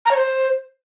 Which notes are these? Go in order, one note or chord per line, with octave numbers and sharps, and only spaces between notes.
A#5
C#5
C5